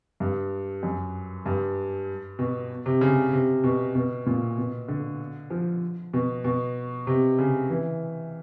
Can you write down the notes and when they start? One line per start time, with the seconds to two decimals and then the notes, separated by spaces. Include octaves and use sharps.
0.20 G2
0.83 F#2
1.46 G2
2.39 B2
2.86 C3
3.01 C#3
3.33 C3
3.64 B2
3.95 B2
4.26 A#2
4.58 B2
4.88 D3
5.50 F3
6.14 B2
6.44 B2
7.07 C3
7.38 C#3
7.70 E3